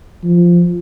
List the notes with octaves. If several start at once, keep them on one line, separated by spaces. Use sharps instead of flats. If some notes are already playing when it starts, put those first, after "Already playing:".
F3